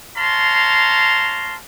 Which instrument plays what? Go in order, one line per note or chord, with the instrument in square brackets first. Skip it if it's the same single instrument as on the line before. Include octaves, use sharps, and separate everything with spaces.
[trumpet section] C#5 F5 A5 A#5 C6